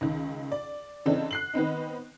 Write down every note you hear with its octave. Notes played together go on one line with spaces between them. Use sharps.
C#2 D#3
D5
C#3 E3 C4 D4 D#4 A4
F#6 C7 F#7
D#3 B3 C4 D#4